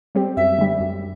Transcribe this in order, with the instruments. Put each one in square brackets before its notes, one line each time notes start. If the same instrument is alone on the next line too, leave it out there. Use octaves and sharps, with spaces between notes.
[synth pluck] G3 C4 G4
[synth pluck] F#2 [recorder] E5
[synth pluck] D3 G3
F#2